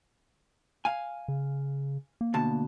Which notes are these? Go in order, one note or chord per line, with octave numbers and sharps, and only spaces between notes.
F5 G#5
C#3
A#3
D2 B2 A5